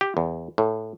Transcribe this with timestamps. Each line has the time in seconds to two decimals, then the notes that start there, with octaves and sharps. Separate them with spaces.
0.01 G4
0.17 E2
0.58 A2